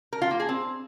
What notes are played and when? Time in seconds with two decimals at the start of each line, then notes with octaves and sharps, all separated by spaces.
0.13 A#4
0.22 F4
0.31 A#3
0.40 G#4
0.49 C4